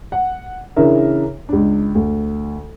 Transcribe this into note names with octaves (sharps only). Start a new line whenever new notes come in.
F#5
C#3 E3 D4 A#4 E5
C#2 D4
D2